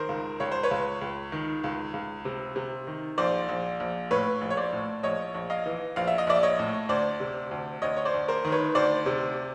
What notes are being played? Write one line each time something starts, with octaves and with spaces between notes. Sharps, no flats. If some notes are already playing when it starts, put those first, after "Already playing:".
Already playing: D#3 A#4 C5
C#2
C#2 C#5
C5
B4 C#5
C#2
C#2
D#3
C#2
C#2
C3
C3
D#3
A#1 C5 D5
A#1
A#1
A2 B4 C#5
A#1
C#5
C5 D5
A2
A#1 C#5 D#5
A#1
D#5 F5
E3
A#1 F5
E5
D#5
A#1 D5 E5
C#5 D#5
A2
D2 C5 D5
C3
D2
D2 C#5 D#5
C#5
C5 D5
D2
A#4 C5
D#3
B4 C#5
D2 C5 D5
C3